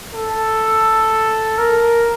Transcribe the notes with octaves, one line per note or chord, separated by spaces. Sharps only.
A4
A#4